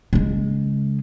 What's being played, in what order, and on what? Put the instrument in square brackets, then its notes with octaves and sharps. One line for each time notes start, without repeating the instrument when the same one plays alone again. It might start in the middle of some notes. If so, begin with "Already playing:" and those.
[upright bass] C#3 G#3